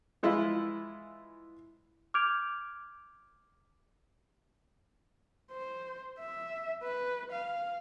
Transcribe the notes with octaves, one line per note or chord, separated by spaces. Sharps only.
E3 G#3 E4 F4
D6 F6 G6 G#6 D7 F7
C5
E5
B4
F5